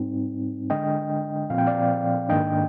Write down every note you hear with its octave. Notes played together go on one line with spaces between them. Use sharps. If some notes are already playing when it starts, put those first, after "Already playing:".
Already playing: G#2 G3 C4 D#4
D3 G#3 D4 D#5 G5
A#2 F3 C4 F5
G5
D5 F5
G#2 D#3 A#3 D4 D#5 G5